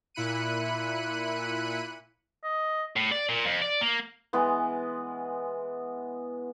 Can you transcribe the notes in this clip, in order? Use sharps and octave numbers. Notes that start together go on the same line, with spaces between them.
A#2 E4 B5 F#6 C#7 D#7
D#5
A2
D5
A#2
F2
D5
A#3
E3 G#3 B3 C6